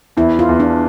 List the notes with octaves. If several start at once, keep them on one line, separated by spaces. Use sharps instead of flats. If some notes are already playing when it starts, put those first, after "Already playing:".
E2 E4
F4
E2
D4